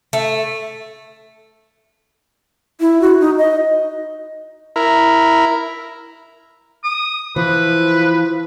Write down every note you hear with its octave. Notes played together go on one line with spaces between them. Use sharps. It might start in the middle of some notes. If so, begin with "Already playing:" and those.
A3
E4
F#4
D#4
D#5
E4 A#4
D#6
E3 F3 B4